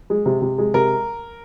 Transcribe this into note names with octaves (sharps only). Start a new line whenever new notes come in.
G#3
C3
C3
G#3
C3 A#4